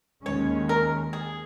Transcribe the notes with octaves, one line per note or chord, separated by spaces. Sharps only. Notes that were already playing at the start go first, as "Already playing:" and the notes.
D#2 D#3 G#3 C#4 C#5
A#4
G#4